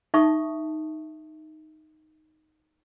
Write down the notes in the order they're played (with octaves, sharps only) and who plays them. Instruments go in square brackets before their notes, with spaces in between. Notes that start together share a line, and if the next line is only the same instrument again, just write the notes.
[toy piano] D#4 E5 A5 C#6 D#6